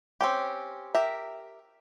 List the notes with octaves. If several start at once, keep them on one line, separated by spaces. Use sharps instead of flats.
C4 C#4 G4
G4 A#4 E5